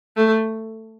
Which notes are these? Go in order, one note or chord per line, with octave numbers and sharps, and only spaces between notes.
A3